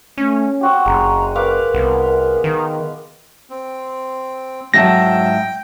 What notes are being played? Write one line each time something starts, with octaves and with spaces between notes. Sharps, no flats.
A3 C#4
C4 F#4 G4 G5
F#1 G#3 A#5
A#4 B4 F5 D6
C2 B3
D#3
C4
G#2 F#3 E5 G5 A5 A#6